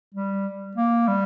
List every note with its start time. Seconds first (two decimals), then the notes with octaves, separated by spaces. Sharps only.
0.14 G3
0.76 A#3
1.08 G3